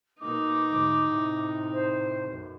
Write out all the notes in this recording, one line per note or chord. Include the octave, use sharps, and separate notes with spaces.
B2 A#3 D#4 D6
D2 G#2
A2 C3
C5
B1 F#2